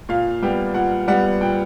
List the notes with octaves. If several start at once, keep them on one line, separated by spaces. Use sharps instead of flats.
A#2 F5
G3 B3 G5
A#2 F#5
G3 B3 F#5
A#2 G5